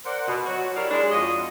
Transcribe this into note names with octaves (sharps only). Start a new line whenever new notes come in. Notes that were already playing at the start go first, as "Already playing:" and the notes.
A#4 C5 D5 F#5
B2
F#3 F#4
E4 G4 A#4 C#5 D5 F5
G#3 D4
F2 F4 F#4 C#5 D#5